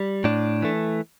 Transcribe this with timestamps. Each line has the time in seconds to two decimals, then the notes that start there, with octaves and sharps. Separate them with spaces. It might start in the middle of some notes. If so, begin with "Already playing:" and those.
Already playing: G3
0.24 A2 D4
0.62 E3 A3